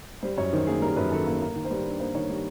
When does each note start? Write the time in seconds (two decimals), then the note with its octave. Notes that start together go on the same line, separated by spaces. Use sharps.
0.23 G3 C5
0.37 F#2 C#5
0.53 D#3 C5
0.67 A#3 G#4
0.82 G3 A#4
0.96 F#2 B4
1.12 D#3 A4
1.26 A#3
1.41 A#3
1.55 D#3
1.64 C5
1.71 G3 B4
1.85 D4
2.00 A#3 C5
2.15 D#3 C#5
2.30 G3